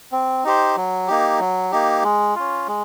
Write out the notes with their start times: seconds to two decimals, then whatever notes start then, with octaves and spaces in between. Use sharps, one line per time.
0.12 C4
0.44 D#4 G4 C5
0.77 F#3
1.07 A#3 D#4 G4
1.40 F#3
1.72 A#3 D#4 G4
2.03 G#3
2.35 C#4 F4
2.67 G#3